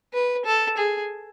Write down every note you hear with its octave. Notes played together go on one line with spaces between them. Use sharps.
B4
A4
G#4